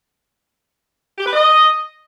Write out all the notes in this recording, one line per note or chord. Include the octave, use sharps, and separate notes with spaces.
G4
B4
D#5